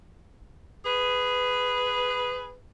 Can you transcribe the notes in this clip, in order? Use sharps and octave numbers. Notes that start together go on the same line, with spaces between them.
G#4 B4